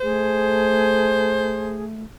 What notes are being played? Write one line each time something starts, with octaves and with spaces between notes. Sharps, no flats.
A3 G#4 C5